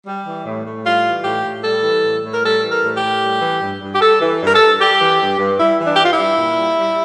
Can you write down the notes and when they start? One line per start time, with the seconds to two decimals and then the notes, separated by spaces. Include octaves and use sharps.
0.06 G3
0.25 E3
0.46 A2
0.65 A2
0.85 G3 F4
1.04 E3
1.24 A2 G4
1.44 A2
1.64 G3 A4
1.83 E3
2.03 A2
2.23 A2
2.33 A#4
2.43 G3 A4
2.63 E3
2.69 A#4
2.82 A2
2.96 G4
3.02 A2
3.22 G3
3.41 E3
3.62 G2
3.81 G2
3.95 G4
4.01 G3 A4
4.20 E3
4.41 G2
4.46 A#4
4.54 A4
4.60 G2
4.80 G3 G4
5.00 E3
5.20 G2
5.39 G2
5.59 G3 E4
5.78 E3
5.85 D4
5.95 G4
5.99 G2 F4
6.11 E4
6.18 G2
6.38 A#2
6.58 G3
6.78 G3